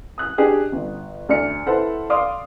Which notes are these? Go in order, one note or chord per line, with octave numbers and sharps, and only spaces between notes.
D#6 F#6
D4 G4 G#4 D#5
G1
D2 D5 F6 C#7
E4 A4 B4 C5 F#5
D5 F5 C6 D6 D#6